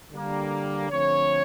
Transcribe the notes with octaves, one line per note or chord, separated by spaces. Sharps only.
D3 G3 A#3
D3 F3 A3 C4 C#5